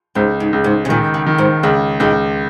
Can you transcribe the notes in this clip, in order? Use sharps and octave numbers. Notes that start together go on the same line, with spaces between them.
C#2 G#2
G#2
C#2
G#2
C#3
A#2 D#3
C#3
D#3
G#2
C#2 C#3
C#2 A#2 D#3